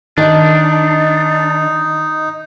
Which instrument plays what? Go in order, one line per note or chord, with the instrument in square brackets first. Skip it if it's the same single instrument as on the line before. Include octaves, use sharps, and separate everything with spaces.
[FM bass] D#3 [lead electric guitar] D4 [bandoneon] D#4 [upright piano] D#5